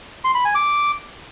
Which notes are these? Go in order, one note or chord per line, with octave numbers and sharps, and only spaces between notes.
C6
B5
G#5
D6